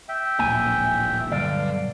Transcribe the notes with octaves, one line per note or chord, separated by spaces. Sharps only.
E5 G5
D1 A#1 A#3 G#5
B1 G2 D3 D5 F5